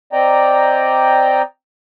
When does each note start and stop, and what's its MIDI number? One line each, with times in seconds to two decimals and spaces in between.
0.13 1.42 60
0.13 1.42 74
0.13 1.42 75
0.13 1.42 79
0.13 1.42 82